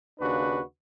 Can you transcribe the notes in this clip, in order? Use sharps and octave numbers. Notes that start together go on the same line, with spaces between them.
D#2 C#3 D4 F#4 B4